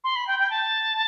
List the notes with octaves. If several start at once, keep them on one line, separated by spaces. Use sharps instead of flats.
C6
B5
G5
G5
A5